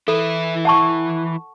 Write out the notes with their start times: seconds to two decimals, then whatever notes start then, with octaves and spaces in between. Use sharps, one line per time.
0.08 E3 E4 A4
0.65 F#5 A5 C#6